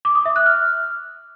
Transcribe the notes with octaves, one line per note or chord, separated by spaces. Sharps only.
D6
D#6
E5
F#6
F6